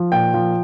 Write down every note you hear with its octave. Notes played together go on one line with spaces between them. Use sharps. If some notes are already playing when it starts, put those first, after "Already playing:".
Already playing: F3
A#2 G5
F3